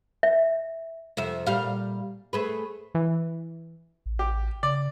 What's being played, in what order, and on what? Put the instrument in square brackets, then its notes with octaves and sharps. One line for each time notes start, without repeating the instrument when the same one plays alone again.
[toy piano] E5
[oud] F2 C3 E5
A#2 G3 F5
A3 G#4 B4
[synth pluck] E3
[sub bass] A1
[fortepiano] G4
[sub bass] C#3 [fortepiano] D5